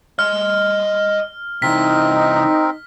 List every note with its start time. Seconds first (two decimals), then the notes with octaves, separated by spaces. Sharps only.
0.19 D#5 C6 F6
1.62 C3 E3 C4 D#4 A#4 B6